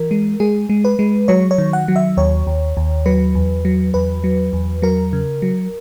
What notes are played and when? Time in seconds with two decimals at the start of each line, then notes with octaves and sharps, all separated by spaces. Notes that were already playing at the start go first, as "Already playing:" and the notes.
Already playing: E3 A#4
0.11 G#3
0.40 G#3 G#4
0.69 G#3
0.85 B4
0.99 G#3
1.28 F#3 C#5
1.51 C#5
1.58 D#3
1.73 F#5
1.88 F#3
1.96 E5
2.17 D#2 C#5
2.47 D#2
2.77 D#2
3.06 F#3 B4
3.35 E2
3.65 F#3
3.94 E2 B4
4.24 F#3
4.53 E2
4.82 F#3 A#4
5.13 C#3
5.42 F#3